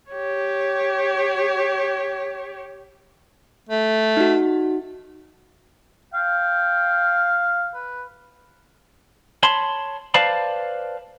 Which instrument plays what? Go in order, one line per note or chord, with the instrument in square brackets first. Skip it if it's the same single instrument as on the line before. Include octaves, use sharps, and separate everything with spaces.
[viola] G4 C#5
[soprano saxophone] A3
[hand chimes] D#4 F#4
[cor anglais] F5 [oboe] G5
[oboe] B4
[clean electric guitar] C#5 A5 B5 C6
B4 C5 D5 F5 A5 B5